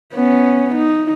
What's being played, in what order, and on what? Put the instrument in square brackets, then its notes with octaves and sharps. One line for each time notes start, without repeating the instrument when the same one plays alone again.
[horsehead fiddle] B3 C#4
D#4